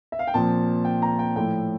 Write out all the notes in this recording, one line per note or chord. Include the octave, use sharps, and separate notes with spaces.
E5
F5
G5
A#2 F3 C4 A5
G5
A#5
G5
A2 F3 A3 G5